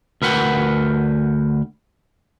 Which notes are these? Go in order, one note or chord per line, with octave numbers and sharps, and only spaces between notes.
D2 A#4 B4 F#5 G5